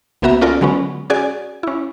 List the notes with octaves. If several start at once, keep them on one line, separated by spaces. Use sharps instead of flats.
C#2 A#3 B3 F#4 E5 A#5
C#4 F4 A4 A#4 D5
D3 F#3 G#3 B3 C#4
C#4 F#4 G#4 D5 G#5
C#4 E4